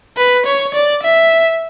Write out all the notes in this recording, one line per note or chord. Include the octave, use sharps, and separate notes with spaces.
B4
C#5
D5
E5